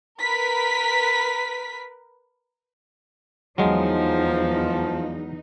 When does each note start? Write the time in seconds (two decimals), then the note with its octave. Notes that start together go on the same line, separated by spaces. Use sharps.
0.21 A#4 B4 B6
3.58 E2 F3 F#3 G#3 D#4